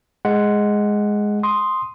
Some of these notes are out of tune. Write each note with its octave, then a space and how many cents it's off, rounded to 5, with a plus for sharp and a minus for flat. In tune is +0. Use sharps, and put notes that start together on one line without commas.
G#3 +0 F#5 +0
C6 +0 D#6 +0